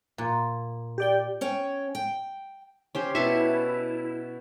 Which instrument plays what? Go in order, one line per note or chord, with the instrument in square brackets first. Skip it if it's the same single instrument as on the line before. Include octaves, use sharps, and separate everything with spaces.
[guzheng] A#2
[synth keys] G4 D5 G5
[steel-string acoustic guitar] C#4 C#5 G5
G5
[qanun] C#4 G4 C5
[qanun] B2 A5 C#6 [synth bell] E4